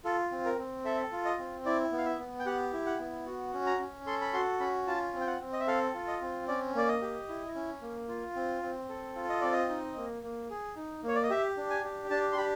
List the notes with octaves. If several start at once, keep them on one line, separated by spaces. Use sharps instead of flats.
F4 A4
C4
A#4
C4
A4 E5
F4
D#5
C4
E4 D5
B3
F5
E5
B3
G5
G4 F#5
E4
F#5
B3
F#4
C#4
A#5
C#4
A4 C6
B5
F#4 C6
C#4 B5
F4 A5
C4
G5
F#5
C4
D#5
E5
A4 F5
F4
D#5
C4
C#4 D5
A#3 D5
D#5
G4
E4
C#4
A#3
F4
C4
C4
A4
F4
D#5
C4 D5
D#5
D#4
A#3
A#3
G#4
D#4
A#3 C#5
D5
D#5
G4 E5
D4
G#5
G4
D4 A5
C6
G4 B5